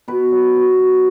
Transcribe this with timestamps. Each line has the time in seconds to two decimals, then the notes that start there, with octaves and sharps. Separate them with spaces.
0.08 B2 B4
0.31 F#3
0.56 B2
0.79 F#3